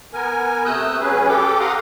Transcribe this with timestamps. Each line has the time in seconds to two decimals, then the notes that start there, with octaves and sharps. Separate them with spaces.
0.14 B3 A#4 G#5
0.65 C3 A3 D#6 E6 F#6 G6
1.00 F#3 C#4 G#4 B4
1.28 G4 A4 G5 D6
1.60 F5 F#5 A#5 C6 D6 D#6